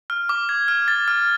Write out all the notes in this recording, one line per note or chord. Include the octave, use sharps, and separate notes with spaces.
F6
D6
G#6
F6
A6
F6